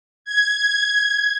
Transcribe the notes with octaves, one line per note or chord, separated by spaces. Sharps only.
G#6